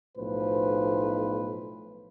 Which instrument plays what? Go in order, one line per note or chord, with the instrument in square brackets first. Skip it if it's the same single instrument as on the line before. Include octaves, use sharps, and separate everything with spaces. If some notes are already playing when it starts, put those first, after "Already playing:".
[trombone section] B1 A2 F3 B4 C5